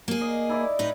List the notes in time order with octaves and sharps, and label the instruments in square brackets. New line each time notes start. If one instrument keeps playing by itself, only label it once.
[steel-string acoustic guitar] A#3 G#4
[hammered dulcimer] D#5
E4 D5
[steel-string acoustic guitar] A2 D#4 B4